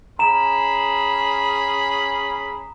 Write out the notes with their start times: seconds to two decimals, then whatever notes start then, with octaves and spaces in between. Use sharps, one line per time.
0.19 C#4 G#4 A#5 B5 E7